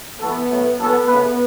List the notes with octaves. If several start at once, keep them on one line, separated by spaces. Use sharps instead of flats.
E3 A3 B3 F#4 A4
A2 F#3 A3
F#2 E3 B3 C#4 A4
C#3 A3 B3 E4 B4